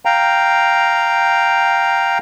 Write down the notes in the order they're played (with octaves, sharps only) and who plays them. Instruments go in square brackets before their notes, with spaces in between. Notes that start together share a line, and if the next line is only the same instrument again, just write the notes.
[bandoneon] F5 G5 A#5